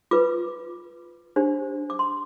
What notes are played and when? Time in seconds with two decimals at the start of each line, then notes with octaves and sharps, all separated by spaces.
0.11 F4 B4 D6
1.36 D4 G4 C5
1.90 D6
1.99 C6